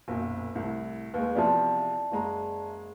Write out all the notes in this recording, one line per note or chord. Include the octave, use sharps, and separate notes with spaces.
F#1 B1 A#2
C2 A2
D#2 G#3 B4
E2 C3 F3 D5 E5 A5
F#1 G#3 A#5